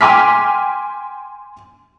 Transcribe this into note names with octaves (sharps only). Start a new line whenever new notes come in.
G5 G#5 C6 D6 F6 B6